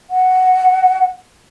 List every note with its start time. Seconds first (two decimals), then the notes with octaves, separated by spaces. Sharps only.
0.10 F#5